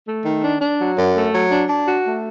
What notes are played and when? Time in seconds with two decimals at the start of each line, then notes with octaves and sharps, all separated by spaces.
0.08 A3
0.25 D#3
0.44 D4
0.61 D4
0.79 F#3
0.98 F#2
1.15 A3
1.34 F#3
1.51 D4
1.69 D4
1.88 F#4
2.06 A3